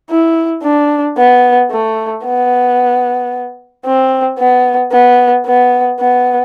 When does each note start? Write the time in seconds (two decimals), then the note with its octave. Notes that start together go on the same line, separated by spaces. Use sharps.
0.10 E4
0.64 D4
1.18 B3
1.71 A3
2.24 B3
3.86 C4
4.39 B3
4.92 B3
5.46 B3
6.00 B3